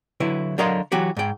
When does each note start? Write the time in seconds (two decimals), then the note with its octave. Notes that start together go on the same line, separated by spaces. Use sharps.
0.20 D3 F#3 E4 B4
0.58 D3 F#3 A#4 D#5 F5 C6
0.92 E3 F#3 F#4 G4
1.17 G#2 G5